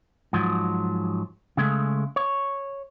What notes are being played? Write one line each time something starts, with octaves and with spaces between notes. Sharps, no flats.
G#2 F3 F#3
C#3 G#3 A3
C#5